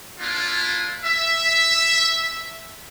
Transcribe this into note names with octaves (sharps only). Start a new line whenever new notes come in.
A#3 D4 E4 F4
E5